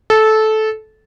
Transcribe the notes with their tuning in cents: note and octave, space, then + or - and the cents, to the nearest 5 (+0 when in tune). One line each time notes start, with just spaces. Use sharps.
A4 -15